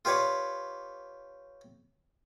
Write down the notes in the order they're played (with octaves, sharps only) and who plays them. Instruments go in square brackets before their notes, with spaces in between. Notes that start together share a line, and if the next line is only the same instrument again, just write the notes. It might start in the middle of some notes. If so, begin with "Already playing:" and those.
[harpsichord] F4 G4 B4 C#5 D5